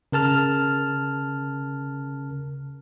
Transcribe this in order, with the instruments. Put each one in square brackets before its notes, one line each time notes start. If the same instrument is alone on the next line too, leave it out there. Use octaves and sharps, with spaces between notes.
[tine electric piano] C#3 A#4 A5 F6